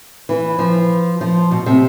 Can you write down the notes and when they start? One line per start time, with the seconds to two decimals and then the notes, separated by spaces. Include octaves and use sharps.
0.29 E3
0.59 F3
1.21 F3
1.51 B2
1.66 C3